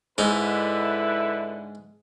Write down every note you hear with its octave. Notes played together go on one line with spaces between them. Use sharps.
G#2 D3 D#4 E4 B4